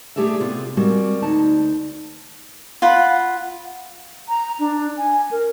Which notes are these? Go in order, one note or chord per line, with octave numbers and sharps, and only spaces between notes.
A3 G4 G#4 D5 E5
C3 B3 F4
G3 G#3 A#3 C4 F#4
D2 D#4 A5
F4 F#5 B5
A#5
D4
G#5
A#4